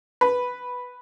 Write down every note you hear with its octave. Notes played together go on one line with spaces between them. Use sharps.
B4